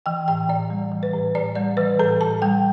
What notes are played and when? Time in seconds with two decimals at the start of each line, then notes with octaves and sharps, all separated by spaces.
0.06 E3 G5
0.28 A2 G5
0.49 A2 D5
0.70 G3
0.92 E3
1.03 B4
1.13 A2
1.35 A2 D5
1.55 G3 D5
1.77 E3 B4
1.99 A2 A4
2.20 A2 A5
2.42 G3 G5